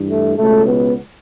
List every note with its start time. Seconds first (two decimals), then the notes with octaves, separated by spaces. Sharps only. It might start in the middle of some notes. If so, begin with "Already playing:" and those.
Already playing: G2 E3
0.09 A3
0.37 C#2 B2 A3
0.66 B3